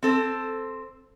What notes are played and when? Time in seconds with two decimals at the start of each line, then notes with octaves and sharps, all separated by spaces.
0.03 C4 A4 C5